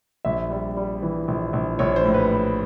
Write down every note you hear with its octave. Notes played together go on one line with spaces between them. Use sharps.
A#1 E5
G3
G3
E3
A#1
A#1
A#1 C#5
C5
A2
B4